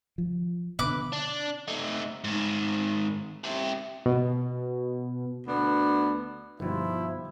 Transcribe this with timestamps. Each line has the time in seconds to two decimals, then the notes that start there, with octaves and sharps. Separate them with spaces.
0.18 F3
0.79 B2 D3 B4 D6
1.13 D4
1.68 A3 D#4
2.24 G#2 D#3
3.44 E4 G4
4.06 B2
5.47 D2 B3 D4
6.60 G1 B2 D#3 F3 G3 E4